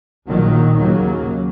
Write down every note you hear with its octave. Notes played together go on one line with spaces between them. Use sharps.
A#1 A#2 D#3 F#3
D#2 C#3 F#3 A#3